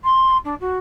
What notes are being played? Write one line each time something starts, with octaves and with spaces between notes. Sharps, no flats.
C6
D4
F#4